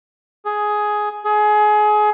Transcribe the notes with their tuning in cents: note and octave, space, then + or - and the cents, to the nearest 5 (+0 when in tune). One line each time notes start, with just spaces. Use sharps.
G#4 +10
G#4 +25